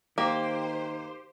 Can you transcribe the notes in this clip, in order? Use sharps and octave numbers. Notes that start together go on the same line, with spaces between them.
D#3 A#3 G4 C5